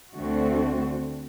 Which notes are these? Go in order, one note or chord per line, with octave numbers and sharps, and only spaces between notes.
D2 D3 A3 C4 F#4